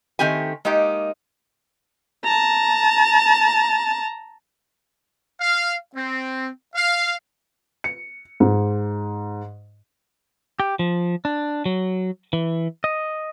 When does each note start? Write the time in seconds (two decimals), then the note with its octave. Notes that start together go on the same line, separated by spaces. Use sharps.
0.19 D#3 A3 C4 G4 G#5
0.65 G#3 A#3 D#4 G4
2.24 A5 A#5
5.40 F5
5.96 C4
6.75 F5
7.84 C#7
8.40 G#2
10.60 G4
10.79 F3
11.25 D4
11.66 F#3
12.33 E3
12.84 D#5